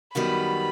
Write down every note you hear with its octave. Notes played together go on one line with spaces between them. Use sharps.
F#2 D#3 G3 B3 F#4 B5